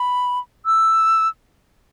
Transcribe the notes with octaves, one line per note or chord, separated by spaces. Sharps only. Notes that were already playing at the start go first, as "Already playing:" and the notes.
Already playing: B5
E6